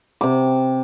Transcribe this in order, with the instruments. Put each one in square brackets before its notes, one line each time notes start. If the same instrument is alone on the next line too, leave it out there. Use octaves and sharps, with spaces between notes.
[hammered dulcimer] C3 D6